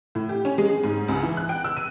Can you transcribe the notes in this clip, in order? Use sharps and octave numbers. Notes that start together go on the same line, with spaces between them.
A2
G4
C#4
G#3
G#4
G#2
C#2
E3
F#6
G5
E6
D#7